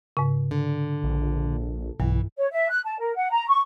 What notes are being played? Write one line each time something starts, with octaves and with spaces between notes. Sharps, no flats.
G#2 C#3
D3
A#1
B1 G2 E3
C#5
E5
F#6
A5
A#4
F#5
A#5
C#6